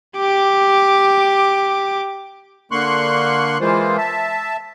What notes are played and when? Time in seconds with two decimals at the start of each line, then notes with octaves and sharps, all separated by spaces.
0.17 G4 D6
2.72 D3 A#3 C6 C#6 F#6
3.61 E3 G#3 A#3 F4 C5
3.98 E5 A5